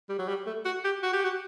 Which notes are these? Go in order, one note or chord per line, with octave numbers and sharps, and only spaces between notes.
G3
F#3
G3
A3
F#4
G4
F#4
G4
F#4